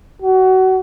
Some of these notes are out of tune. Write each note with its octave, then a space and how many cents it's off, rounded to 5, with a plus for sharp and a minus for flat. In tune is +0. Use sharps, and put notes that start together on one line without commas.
F#4 +25